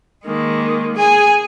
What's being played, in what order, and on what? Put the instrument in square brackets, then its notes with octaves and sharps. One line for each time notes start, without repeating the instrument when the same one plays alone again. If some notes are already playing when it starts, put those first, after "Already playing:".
[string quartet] D#3 G#3 A#3
G#4 G#5 D#6